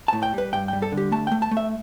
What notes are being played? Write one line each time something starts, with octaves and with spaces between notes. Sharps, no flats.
A2 A5
G5
G3 B4
G2 G5
G3 G5
A4
D3
G4
A3 A5
A3 G5
A5
A3
E5